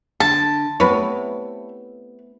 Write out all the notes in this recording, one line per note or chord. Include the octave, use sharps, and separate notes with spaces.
D3 A5
C3 A3 B3 E4 B4 C#5